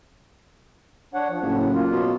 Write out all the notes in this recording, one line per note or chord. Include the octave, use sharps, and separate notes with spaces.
D4 C#5 F#5
F3
F#1 A2
A#3 F4
B2